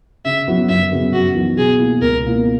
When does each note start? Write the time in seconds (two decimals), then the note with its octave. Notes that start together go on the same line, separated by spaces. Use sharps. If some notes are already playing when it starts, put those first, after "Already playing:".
0.25 C#3 E5
0.48 F#3 B3 E4
0.69 F#2 E5
0.91 C#3 F#3 B3
1.13 F#2 F#4
1.35 E3 B3 D#4
1.57 B2 G#4
1.80 A#3 E4
2.01 C#2 A#4
2.25 B2 A#3 E4